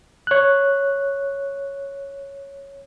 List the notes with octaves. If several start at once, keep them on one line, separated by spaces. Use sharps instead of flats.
C#5 F#6